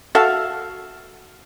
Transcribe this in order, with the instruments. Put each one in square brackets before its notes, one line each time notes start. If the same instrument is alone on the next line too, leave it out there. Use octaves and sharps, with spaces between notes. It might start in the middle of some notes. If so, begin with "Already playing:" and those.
[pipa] F#4 A4 E5 F5